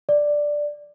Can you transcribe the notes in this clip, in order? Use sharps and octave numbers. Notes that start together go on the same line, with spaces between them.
D5